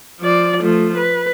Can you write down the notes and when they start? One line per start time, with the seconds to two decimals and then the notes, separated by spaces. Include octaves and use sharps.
0.20 F3 D5
0.60 F3 A3
0.97 B4